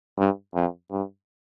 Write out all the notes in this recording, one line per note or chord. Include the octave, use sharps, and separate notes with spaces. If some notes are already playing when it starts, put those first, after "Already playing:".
G2
F2
G2